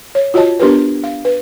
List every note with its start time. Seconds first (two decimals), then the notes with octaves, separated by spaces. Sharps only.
0.15 C#5
0.34 F4 F#4 C#5 D#5 A5
0.59 B3 D4 G4 A#4 B4
1.04 F5
1.25 B4